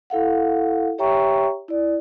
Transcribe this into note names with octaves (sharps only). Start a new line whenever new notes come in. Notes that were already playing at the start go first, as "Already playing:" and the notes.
E4 A4 F5 F#5
G4 C#5 E5 G5 A#5 C#6
E4 D5